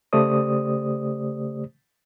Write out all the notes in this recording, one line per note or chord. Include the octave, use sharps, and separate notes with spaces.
C#3 A3 G4 C5 D5 D#6